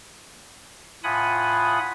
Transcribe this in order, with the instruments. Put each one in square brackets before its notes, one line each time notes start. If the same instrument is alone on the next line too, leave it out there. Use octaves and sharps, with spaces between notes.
[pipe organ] A2 F4 F#5 G#5 B5 D#6